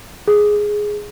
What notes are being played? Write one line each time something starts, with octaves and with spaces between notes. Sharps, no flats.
G#4